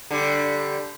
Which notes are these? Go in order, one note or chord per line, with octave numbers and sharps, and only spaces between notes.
D3 G3